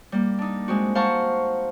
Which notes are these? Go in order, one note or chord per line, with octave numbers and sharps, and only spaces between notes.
G3 A#3
D4 D#4
G#3 C4 F#4
C5 F5 F#5 A5 A#5 C#6